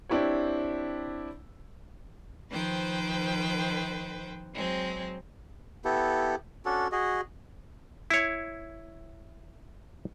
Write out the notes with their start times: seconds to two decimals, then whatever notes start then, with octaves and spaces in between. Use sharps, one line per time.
0.09 C4 D4 E4 G4 C#5
2.50 D#3 F3 B4 C5 G5
4.54 F#3 G#3 C4
5.85 B3 E4 G4 A4
6.65 C#4 D4 F#4 A4
6.92 F#4 G#4 D#5
8.10 E4 C#5